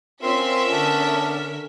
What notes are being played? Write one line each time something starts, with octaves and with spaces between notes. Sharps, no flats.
C4 C#4 F4 A#4 E5 C6 B6
D3 B3 D4 A4